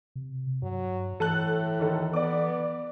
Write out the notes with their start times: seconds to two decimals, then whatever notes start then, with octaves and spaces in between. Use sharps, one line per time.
0.16 C3
0.62 G2 F#3
1.20 A2 E3 A4 A5 F#6
1.79 D#2 D#3 A4
2.13 B3 D5 D6